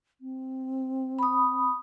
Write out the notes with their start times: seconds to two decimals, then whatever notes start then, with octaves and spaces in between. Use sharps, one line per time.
0.21 C4
1.19 B5 D#6